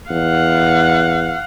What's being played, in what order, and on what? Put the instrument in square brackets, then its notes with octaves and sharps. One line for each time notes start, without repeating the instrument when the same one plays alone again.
[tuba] E2 [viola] F5 F#5